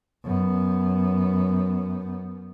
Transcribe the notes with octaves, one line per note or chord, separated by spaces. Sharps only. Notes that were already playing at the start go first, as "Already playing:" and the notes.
F#2 B3